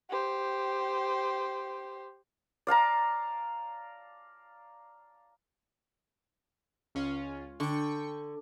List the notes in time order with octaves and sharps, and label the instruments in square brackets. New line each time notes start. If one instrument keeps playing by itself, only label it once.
[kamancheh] G4 C5
[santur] D5 F5 A5 A#5
[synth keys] C#2 C#4 F4
[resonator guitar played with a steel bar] D3 [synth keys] G5 C#6